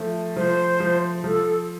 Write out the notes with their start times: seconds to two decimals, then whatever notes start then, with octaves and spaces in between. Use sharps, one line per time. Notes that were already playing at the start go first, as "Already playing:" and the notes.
Already playing: F3 A3
0.36 F3 C5
0.80 F3
1.24 F3 A4